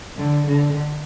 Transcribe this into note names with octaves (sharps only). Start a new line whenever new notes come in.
D3
D3